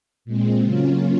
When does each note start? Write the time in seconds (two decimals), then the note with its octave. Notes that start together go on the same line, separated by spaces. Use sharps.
0.25 A#2 G#3 C4
0.62 C#3 F#3 A#3 C#4 F4